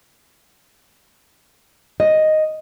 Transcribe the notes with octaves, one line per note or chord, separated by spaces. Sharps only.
D#5